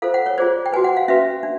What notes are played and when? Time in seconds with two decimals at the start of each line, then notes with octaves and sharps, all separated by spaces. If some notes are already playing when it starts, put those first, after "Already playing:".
0.02 F4 A4 C5 F5
0.14 F#5
0.26 C#5
0.38 F4 G#4 C5 D5
0.66 G5
0.73 F#4 B4 G#5
0.84 F#5
0.97 F5
1.08 C#4 F#4 B4 E5
1.43 D4